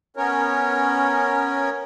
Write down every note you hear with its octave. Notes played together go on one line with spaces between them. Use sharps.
B3 C#4 A#4 C#5